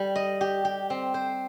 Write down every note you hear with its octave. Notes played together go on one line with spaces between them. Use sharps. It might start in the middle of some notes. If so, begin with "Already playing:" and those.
Already playing: G3
D#5
G4
G4
C4
C5